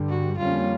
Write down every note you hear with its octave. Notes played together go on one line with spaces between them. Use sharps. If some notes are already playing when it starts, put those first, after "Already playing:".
Already playing: G2 D3 G3
F#4
F2 D3 G3 A#3 C#4 F4